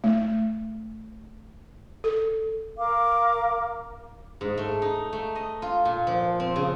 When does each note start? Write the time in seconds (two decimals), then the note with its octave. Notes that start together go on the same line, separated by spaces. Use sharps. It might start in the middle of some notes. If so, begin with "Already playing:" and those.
0.04 A3
2.04 A4
2.77 A#4 F5 D6
4.41 G#2
4.58 A3
4.82 D#4
5.13 A3
5.35 D#5
5.62 F4
5.85 A#2
6.07 F3
6.40 C4
6.56 C#3